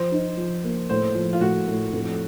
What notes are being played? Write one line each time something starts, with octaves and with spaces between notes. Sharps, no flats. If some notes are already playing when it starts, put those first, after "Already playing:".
Already playing: F3 C5
D#4
F3
A#3
A2 C5
F3
F4
A2 F#4
A2
F2